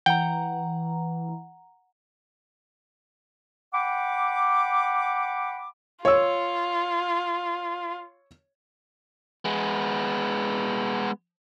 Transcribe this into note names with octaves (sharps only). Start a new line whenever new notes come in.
E3 F#5 G5 A#5
F#5 G5 B5 D6
F4 C#5 E6
G#3 B3